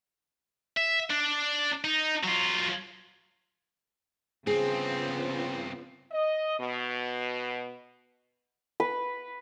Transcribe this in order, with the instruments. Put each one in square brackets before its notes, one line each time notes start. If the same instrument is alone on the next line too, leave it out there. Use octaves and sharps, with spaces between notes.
[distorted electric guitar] E5
D4
D#4
F#3 F4
[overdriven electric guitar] G2 C4 [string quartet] C#3 F3 B3 [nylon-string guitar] G#4
[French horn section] D#5
B2
[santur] B4